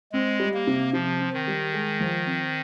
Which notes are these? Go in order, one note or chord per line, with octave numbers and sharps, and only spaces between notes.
G#3 C4
G3
A#3
C3
C3 F3
C4
D#3
G3
G#3
F3
C4